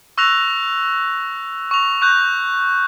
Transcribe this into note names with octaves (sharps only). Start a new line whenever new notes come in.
C#6 E6 F#6 A#6 F7
C#6 F7
C#6 F#6 G6